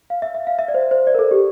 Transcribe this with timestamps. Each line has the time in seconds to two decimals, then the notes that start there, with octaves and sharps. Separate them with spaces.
0.10 F5
0.22 E5
0.35 E5
0.47 F5
0.59 E5
0.68 D5
0.74 C5
0.91 C5
1.07 D5
1.15 A#4
1.19 A4
1.31 G4